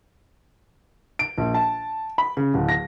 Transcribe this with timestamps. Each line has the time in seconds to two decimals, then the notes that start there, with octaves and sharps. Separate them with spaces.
1.19 D7
1.38 A#1
1.54 A5
2.18 B5
2.37 C#3
2.54 D1
2.69 A#6